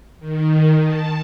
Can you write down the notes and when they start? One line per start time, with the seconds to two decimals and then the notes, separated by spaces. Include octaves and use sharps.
0.20 D#3
0.83 A5